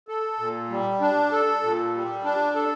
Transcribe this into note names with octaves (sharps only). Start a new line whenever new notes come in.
A4
A#2
G3
D4
A4
A#2
G3
D4
A4